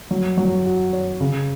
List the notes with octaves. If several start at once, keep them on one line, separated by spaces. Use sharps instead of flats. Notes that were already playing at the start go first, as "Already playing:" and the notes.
F#3
F#3
F#4
C#5
C#3